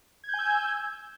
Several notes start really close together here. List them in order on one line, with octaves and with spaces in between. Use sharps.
G#6 G6 G#5 E6